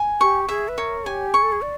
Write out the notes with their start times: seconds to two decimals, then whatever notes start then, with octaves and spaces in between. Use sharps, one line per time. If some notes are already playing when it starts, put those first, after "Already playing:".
Already playing: G#5
0.21 G4 C#6
0.49 G#4 E5
0.68 B4
0.78 A#4 C#5
1.05 G4 G#5
1.34 G#4 C#6
1.43 A4
1.52 G#4
1.62 D5